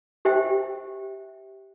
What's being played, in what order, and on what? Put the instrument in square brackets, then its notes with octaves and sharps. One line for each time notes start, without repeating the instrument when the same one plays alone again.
[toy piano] G4 C5 E5 G5